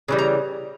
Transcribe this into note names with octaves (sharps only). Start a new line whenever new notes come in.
C#3 E3 G3
A#5